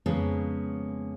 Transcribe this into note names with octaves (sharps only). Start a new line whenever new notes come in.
F2 C#3 G#3 A#3 B3 C#4